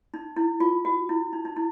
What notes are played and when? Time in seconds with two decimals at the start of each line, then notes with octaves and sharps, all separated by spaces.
0.14 D#4
0.36 E4
0.60 F4
0.85 F#4
1.09 E4
1.33 D#4
1.45 D#4
1.57 E4